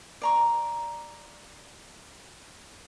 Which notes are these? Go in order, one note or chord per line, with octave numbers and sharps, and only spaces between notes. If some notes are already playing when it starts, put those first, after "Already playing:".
D5 A#5 C#6